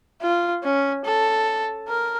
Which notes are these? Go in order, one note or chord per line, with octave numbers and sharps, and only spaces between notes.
F4
C#4
A4
A#4